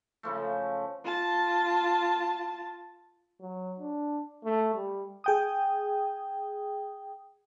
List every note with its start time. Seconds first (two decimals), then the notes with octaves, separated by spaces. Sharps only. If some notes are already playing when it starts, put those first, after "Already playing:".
0.23 C#3 F3 A3
1.04 F4 A5
3.41 F#3
3.80 D4
4.44 A3
4.75 G3
5.24 G#4 G5 D#6